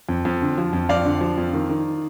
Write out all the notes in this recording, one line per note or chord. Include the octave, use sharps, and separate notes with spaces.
F2
F2
D3
F3
F2
F2 D5 F5
D3
F3
F2
D#3
D#3